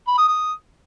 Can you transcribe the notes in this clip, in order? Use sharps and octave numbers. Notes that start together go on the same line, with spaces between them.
B5
D#6
D#6